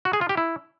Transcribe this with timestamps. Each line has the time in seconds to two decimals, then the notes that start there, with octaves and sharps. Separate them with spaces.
0.05 F#4
0.13 G#4
0.21 F4
0.29 G4
0.37 E4